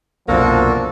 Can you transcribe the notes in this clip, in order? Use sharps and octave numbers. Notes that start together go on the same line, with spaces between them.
C2 F#2 B2 F3 A#3 D4 F#4 A4